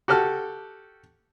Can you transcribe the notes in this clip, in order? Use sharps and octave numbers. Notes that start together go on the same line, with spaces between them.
F#4 G4 A4 F6